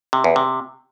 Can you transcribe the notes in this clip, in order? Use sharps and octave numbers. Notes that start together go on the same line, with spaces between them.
C3
E2
C3